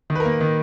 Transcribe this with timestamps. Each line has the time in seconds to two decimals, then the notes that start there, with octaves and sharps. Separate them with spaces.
0.10 D#3
0.15 B4
0.20 A#4
0.25 A#3
0.41 D#3